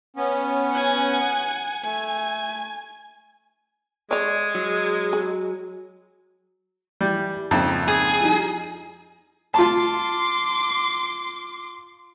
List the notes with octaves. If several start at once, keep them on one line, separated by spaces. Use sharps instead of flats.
B3 C#4
F#5 G#5
A3 G#5
G#3 C#5 D5
F#3
G#4
E3 G3
A#1 F2 G#2 C#3
G#4
F3 G3 D#4
F4 A5 C6 D6